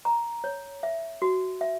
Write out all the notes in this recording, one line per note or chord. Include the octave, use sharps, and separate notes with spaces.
A#5
C#5
E5
F#4
E5